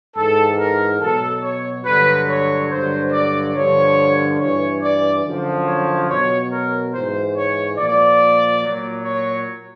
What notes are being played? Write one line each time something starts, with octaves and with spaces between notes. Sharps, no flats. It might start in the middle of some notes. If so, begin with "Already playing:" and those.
G#2 E3 A4
A#4
B2 F#3 A4
C#5
G2 D3 F#3 B4
C#5
G2 D3 F#3 C5
D5
G2 D3 F3 C#5
G2 E3 C#5
D5
F#2 D3 F3
C#5
B2 F#3 C#5
A#4
G#2 E3 C5
C#5
A#2 F3 D5
A#2 F#3
C#5